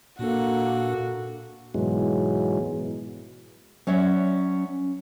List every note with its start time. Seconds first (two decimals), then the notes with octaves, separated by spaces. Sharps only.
0.19 A#2 A#3 D4 F#4 A4
1.74 G#2 B2 E3 F#3 G#3
3.87 F#3 C#4 D5 E5